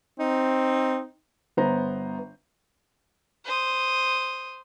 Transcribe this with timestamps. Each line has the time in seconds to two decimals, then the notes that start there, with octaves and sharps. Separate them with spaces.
0.19 C4 D#4
1.57 G1 B3 C5 A#5
3.45 C5 D#6